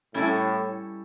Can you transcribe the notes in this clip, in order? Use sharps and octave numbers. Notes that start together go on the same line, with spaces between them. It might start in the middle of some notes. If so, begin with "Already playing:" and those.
A2 G3 C#4 E4 A4